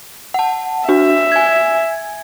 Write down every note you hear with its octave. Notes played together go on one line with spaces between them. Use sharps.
F#5 A5
D4 F#4 E5
G#5 G#6